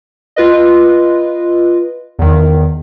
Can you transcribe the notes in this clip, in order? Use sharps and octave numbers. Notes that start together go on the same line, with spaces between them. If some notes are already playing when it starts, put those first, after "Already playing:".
F4 B4 D#5
E2 D#3